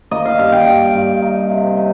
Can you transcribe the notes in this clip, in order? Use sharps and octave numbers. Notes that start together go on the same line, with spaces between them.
A#3 D#5
F5
G2 F5
G5
G2
G2
D#4
C3
D#4